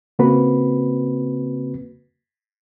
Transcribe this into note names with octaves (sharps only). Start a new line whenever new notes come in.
C#3 A#3 C4 F#4 B4